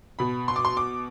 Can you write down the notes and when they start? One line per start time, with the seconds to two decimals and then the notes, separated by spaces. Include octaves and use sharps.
0.19 B2 B5
0.48 C6
0.56 D6
0.65 C6
0.77 D6